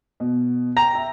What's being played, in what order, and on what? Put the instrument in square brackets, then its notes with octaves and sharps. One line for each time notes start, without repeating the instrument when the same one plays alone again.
[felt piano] B2
[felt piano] G5 [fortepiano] A#5
[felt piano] E5